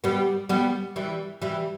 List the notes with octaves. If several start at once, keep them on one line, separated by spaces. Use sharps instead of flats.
G3 B3
G3 B3
E3 G3
E3 G3